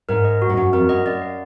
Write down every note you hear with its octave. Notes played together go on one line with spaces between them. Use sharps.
G#2 A#4
D#5
F#4
G#2
F#2 F#4
F2 A#4
F#2 D#5
F#2 D5
F5